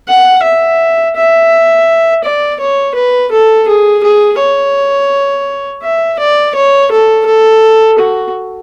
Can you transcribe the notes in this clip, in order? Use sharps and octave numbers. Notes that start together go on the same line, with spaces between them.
F#5
E5
E5
D5
C#5
B4
A4
G#4
G#4
C#5
E5
D5
C#5
A4
A4
F#4